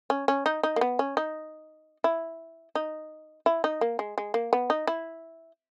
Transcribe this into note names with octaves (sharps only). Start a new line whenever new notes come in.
C#4
C#4
D#4
D#4
A#3
B3
C#4
D#4
E4
D#4
E4
D#4
A#3
G#3
G#3
A#3
B3
D#4
E4